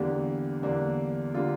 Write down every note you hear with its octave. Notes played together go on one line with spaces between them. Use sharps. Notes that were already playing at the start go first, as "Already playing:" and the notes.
Already playing: E2 D3 G3 A#3 D4 G4
E2 D3 G3 A#3 D4
D3 G3 A#3 F4